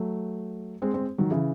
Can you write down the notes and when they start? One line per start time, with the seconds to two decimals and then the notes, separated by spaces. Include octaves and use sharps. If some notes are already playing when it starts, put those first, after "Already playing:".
Already playing: F#3 A3
0.82 G#3 C4
0.94 G#3 C4
1.18 D#3 F#3
1.31 C#3 E3